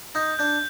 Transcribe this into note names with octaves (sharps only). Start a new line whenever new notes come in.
D#4 G6
D4 G6